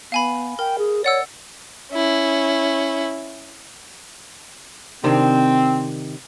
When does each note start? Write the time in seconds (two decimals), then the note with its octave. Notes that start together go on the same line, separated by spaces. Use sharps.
0.12 B3 F5 G#5 B5
0.59 A#4 G5
0.78 G#4
1.04 C#5 D5 F#5 E6
1.92 C#4 E4
5.04 C3 D#3 C4 D4